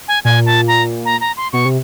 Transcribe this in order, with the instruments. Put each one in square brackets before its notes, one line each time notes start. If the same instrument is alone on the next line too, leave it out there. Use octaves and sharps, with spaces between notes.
[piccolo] G#5
[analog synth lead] A#2 [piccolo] G#5
[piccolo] A5
A#5
A#5
A#5
C6
[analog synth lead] B2 [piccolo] C#6
[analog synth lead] C3